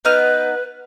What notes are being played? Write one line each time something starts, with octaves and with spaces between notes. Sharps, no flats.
B3 D#4 B4 F6